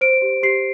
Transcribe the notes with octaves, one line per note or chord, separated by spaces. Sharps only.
C5 D7
G4
G4 C7